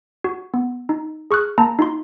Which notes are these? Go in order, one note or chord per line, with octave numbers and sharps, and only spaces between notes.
F#4
B3
D#4
G#4 C#6 F6 F#6
A#3 A5 A#5
D#4 F4 C6